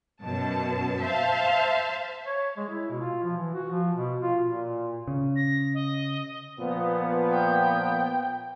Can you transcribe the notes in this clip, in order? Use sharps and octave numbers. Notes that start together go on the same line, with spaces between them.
F#2 B2 A5
C5 E5 F5 A5
C#5
G#3
E4
B2
F4
F3
E3
F#4
F3
B2
F4
A#2
C#3
A#6
D#5
A#2 F3 B3
G5